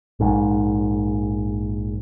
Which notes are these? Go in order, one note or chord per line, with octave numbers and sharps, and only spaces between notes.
A#1 G#2